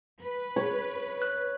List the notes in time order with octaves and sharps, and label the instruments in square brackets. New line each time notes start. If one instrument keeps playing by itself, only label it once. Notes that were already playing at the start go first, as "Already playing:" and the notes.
[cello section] B4
[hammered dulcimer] C#5
[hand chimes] F#6